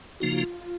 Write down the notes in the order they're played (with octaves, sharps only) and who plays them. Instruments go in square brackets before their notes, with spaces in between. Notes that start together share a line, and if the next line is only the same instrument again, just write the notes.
[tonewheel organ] C#3 F3 A#3 D#4 F#4 [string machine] F4